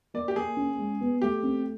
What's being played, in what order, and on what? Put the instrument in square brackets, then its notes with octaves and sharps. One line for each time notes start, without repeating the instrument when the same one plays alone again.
[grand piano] A#3 [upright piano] D5
[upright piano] G4
[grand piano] A#3 [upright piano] G#4
[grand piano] C#4
G#3
B3
[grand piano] A3 [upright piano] G4
[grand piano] C4